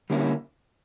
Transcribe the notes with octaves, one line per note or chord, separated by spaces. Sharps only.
D3 G3 A#3 C#4 E4